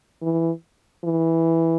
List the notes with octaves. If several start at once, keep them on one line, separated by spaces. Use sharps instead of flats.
E3
E3